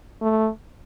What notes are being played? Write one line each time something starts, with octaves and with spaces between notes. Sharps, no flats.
A3